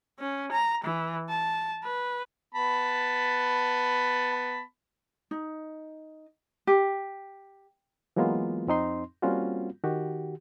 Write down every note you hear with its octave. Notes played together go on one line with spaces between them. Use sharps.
C#4
A#5
E3
A5
B4
B3 A5 B5
D#4
G4
E3 F#3 G#3 A#3 B3 F4
F2 C4 D#4 C6
G3 A#3 C4 C#4 F4 F#4
D#3 F#4 G4